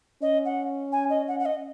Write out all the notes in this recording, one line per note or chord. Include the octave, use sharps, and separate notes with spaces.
C#4 D#5
F#5
G#5
D#5
F#5
F#5
D#5